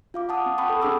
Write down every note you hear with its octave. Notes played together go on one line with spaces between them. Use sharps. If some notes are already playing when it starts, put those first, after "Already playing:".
F4 F5 D6
F#5 A5 D#6
C4
F#5 G5 A5 B5 C#6 D#6
A4
C4 D4 G#4 D6 E6